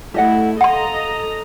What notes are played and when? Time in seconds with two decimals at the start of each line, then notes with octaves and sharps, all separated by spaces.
0.14 A3 E4 G4 D#5 F#5
0.61 A4 D#5 F5 F#5 A#5 C6